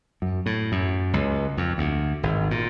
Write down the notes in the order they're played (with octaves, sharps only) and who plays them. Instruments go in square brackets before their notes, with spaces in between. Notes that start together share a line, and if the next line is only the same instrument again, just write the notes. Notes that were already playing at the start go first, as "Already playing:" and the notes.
[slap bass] F#2
A2
F#2
C#2
F2
D2
G#1
A#2